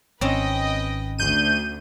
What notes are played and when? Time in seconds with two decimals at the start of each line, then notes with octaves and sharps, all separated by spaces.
0.21 G#1 C4 C#4 B4 D#5 G5
1.18 D2 G6 D#7